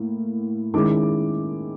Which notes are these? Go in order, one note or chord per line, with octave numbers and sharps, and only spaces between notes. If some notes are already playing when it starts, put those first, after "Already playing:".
Already playing: A2 A#3
D#3 G#3 C#4 E4 D6